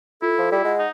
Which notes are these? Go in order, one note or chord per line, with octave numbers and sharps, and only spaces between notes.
E4 F4 A4
F3
G3 E4
G#3 F#5
D#4